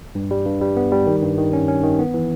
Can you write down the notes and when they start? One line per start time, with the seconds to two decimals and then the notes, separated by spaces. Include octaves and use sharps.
0.15 G2
0.31 G3
0.46 G2
0.61 G3
0.77 B3
0.92 G3
1.07 D#3
1.22 G2
1.38 D#3
1.53 C#4
1.68 C#4
1.83 D#3
1.99 B3
2.14 E3